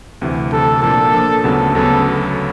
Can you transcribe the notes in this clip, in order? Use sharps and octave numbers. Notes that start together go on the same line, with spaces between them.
D2 C3 E3
D2 C3 E3 A4
A#2 F3 A#3 D4 A4
A#2 F3 A#3 D4
D2 C#3 F#3 B3 A4
D2 C#3 F#3 B3 A4